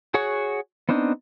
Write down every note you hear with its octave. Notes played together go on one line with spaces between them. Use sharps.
F#4 G#4 C#5 F#5 C#6
B3 C4 D4 D#4